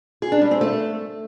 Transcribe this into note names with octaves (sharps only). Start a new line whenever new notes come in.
G#4
D4
G3
C4
A3